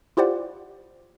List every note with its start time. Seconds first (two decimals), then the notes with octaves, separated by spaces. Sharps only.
0.17 E4 F4 G4 C5 D5 F#5